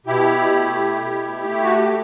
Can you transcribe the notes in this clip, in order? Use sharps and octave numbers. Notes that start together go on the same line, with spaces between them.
B2 E4 G4
A3
B2
A3
E4
F#4
G4